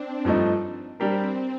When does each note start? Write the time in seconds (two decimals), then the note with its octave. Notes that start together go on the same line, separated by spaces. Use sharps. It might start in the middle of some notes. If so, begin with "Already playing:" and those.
Already playing: C4 D4
0.25 G2 F3 A3 D#4
1.00 G3 C4 D4 G4 A#4